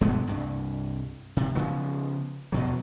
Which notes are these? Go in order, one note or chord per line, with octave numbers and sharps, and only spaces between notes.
G2 B2 G#3 B3
C2 G2
C3
C#3 F3 B3
E2 B2 F#3